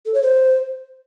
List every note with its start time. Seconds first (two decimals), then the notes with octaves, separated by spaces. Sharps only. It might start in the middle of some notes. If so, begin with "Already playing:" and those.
0.06 A4
0.14 C#5
0.22 C5